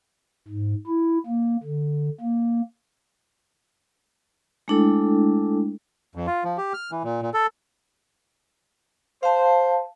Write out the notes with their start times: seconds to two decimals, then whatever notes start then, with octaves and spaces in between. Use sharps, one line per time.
0.48 G#2
0.87 E4
1.27 A#3
1.64 D3
2.21 A#3
4.68 G#3 A3 D4 E4 A4 G5
6.15 F2
6.27 F4
6.44 F3
6.58 G4
6.74 F6
6.92 E3
7.04 A#2
7.22 A#2
7.34 A4
9.23 C5 F5 A5